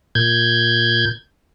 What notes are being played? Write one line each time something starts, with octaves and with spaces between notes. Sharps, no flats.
A#2 G6 G#6